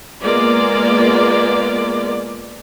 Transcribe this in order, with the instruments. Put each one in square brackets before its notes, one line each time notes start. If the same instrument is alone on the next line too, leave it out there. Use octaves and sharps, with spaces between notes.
[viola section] G#3 A#3 B3 F4 D5